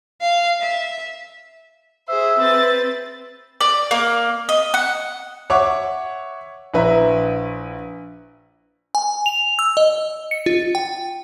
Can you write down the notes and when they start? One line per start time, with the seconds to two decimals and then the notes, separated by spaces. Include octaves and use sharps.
0.21 F5
0.62 E5
2.09 G#4 C5 E5
2.38 C4 B4 A6
3.61 D5
3.91 A#3
4.49 D#5
4.74 F#5
5.50 C#5 E5 F#5 C#6 D6
6.74 A#1 E4 B4 A#5
8.95 G#5
9.26 F7
9.59 E6
9.77 D#5
10.31 C#7
10.46 F4
10.75 G5